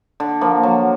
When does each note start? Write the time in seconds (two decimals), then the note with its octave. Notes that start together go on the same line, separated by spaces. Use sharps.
0.20 D3
0.41 F3 A#3
0.63 F#3